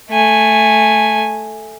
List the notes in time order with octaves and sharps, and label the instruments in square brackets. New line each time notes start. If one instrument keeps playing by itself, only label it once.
[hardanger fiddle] A3 G#5